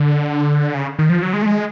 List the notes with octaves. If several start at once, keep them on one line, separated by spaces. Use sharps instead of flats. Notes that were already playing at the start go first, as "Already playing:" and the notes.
Already playing: D3
C#3
D#3
F3
F#3
G#3
A3
G#3